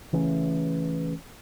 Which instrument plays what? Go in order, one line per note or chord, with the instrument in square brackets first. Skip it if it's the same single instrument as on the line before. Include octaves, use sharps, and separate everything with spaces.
[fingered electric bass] C#3 E3 A3 C#4